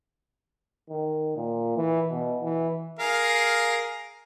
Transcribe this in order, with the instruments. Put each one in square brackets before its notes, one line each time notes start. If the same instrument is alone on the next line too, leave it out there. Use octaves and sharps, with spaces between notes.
[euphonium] D#3
A#2
E3
B2
E3
[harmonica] G#4 A#4 F5